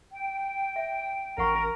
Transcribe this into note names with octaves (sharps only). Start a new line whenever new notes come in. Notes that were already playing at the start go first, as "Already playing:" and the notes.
G5
E5
A1 A#4 C#5 F#5 C#6